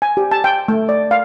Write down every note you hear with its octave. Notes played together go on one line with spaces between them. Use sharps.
G#5
G4
A5
G5
A3
D5
F5